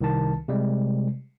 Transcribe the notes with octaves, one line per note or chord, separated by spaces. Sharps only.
C2 D#3 A5
C3 G3 G#3